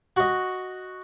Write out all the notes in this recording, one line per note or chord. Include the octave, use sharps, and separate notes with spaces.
F#4 D#5